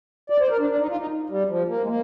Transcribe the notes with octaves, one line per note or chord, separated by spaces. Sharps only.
D5
C5
A#4
D4
D4
D#4
F4
D#4
G3
F3
A#3
G#3
A#3